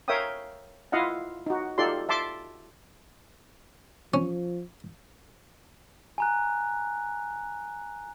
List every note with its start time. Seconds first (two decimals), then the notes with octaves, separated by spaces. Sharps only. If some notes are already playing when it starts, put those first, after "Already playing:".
0.08 A#4 C#5 E5 F5 G5 D#6
0.92 E4 F4 D#5 F5 F#5
1.46 D#4 F#4
1.78 D#4 F4 G4 A4 D5 C6
2.09 E5 A5 C6 D6
4.14 F3 C#4
6.18 G#5 A#5 F#6